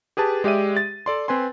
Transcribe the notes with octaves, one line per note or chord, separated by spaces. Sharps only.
G4 G#4 B4 A5
G#3 G4 D5 E5 D#7
A6
A4 D5 C6
C4 B4 G#5 C6